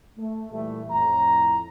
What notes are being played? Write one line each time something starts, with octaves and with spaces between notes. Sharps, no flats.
A3
A#2 E3 G3 A3
F2 A2 A#5